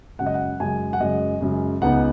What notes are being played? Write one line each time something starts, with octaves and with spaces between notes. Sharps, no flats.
F#2 C#3 G#3 F#5
D#5
F#5
F#2 C#3 G#3 G#5
F#5
F#2 C#3 G#3 D#5
F#2 C#3 G#3
C#2 C#3 B3 D#4 F#5